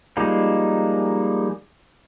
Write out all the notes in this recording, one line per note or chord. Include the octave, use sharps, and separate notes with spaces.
F3 G3 G#3 A#3 D#4